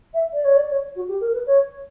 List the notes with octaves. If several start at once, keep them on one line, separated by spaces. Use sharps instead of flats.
E5
D5
C#5
D5
C#5
F#4
G4
A#4
B4
C#5